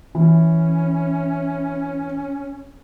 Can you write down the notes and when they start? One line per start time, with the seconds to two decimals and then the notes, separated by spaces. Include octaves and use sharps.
0.15 E3 C#4